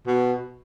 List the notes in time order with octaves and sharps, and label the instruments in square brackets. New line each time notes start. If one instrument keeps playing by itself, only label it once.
[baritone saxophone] B2